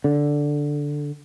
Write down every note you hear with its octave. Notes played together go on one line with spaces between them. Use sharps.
D3